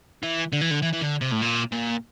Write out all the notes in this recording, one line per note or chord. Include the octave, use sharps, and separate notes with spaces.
E3
D3
E3
D3
E3
E3
D3
C3
A2
A#2
A#2